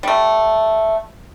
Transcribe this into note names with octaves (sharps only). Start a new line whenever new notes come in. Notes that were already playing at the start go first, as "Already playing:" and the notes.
G3 A3